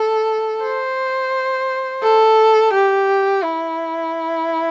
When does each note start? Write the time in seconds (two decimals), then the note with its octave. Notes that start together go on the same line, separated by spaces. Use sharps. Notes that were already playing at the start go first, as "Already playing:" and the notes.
Already playing: A4
0.63 C5
2.03 A4
2.73 G4
3.43 E4